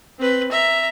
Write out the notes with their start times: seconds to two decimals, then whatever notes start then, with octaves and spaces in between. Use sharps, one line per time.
0.18 C4 B4
0.51 E5 A#5